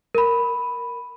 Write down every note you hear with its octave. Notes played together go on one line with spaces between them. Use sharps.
A#4 B5